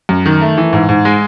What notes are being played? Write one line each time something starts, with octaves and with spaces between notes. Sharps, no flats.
F#2
D#3
A3
E3
G#2
G#2
G#3